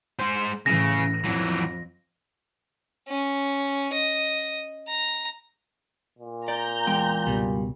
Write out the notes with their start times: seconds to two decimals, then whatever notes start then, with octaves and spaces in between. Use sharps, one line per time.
0.19 G#3 C5
0.66 A2 C#3 E3 A#6
1.24 F2 E3 F#3
3.09 C#4
3.93 D#5
4.88 A#5
6.19 A#2
6.48 D5 A#5 G6
6.87 E2 G#3 G5
7.27 C#2 G2 B2 G3